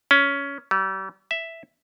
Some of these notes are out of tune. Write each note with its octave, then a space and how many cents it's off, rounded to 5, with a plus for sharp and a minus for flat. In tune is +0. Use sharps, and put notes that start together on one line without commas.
C#4 +15
G3 -40
E5 +0